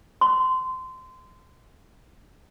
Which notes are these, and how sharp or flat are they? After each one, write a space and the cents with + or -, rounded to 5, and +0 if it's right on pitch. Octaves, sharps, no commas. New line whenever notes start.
C6 -20